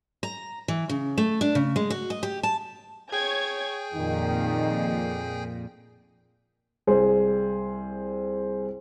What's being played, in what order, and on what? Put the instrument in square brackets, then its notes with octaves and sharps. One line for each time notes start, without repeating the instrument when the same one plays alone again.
[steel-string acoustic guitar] A#5
E3
C#3
A3
D4
C#3
G#3
F#4
D#5
G4
A5
[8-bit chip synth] G#4 G5 [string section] C#5 G#6
[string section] F2 A#2 [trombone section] D#3
[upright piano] C2 G#4 C5